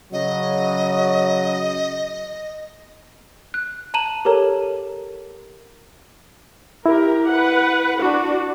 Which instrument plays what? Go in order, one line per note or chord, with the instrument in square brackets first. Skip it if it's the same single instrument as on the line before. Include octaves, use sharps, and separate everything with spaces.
[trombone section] C#3 F#3 [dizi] D#5
[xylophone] F#6
A5 A#5 D#7 E7 F#7
G4 A4 A#4 C#5 A#5
[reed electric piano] E4 [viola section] G4 A#4
[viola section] B4 F#5
[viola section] D4 [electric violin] F#4